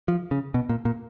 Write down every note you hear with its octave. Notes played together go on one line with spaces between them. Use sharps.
F3
C#3
B2
A#2
A#2